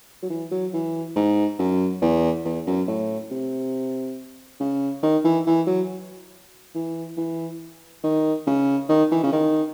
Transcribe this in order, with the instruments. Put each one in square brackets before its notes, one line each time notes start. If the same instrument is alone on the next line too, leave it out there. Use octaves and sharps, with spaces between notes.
[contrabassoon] F#3
E3
F#3
E3
G#2
F#2
E2
E2
F#2
A2
C3
C#3
D#3
E3
E3
F#3
E3
E3
D#3
C#3
D#3
E3
C#3
D#3